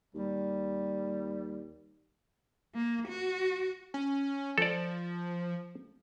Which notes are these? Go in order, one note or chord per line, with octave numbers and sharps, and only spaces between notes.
D#2 G3
A#3
F#4
C#4
F3 A4 D5